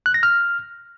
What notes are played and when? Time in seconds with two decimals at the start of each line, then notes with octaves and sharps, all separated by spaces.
0.06 F#6
0.14 A#6
0.23 F6